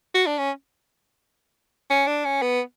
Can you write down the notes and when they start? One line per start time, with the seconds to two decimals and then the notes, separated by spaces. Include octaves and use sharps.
0.14 F#4
0.26 D4
0.38 C#4
1.90 C#4
2.07 D4
2.25 C#4
2.42 B3